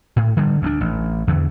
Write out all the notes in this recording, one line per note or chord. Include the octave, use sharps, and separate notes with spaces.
A2
D3 G3
D2 A#3 D4
A1
E2 D3